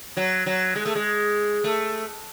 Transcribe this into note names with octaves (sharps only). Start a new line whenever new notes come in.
F#3
F#3
G#3
A3
G#3
A3